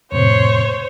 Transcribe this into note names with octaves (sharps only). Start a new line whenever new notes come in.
F2 A2 C3 C5 C#5